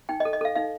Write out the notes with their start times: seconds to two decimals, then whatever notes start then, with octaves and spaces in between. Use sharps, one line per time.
0.09 D#4 G5
0.20 D#5
0.25 A4
0.33 D#5
0.41 A4 F5
0.55 D#4 F5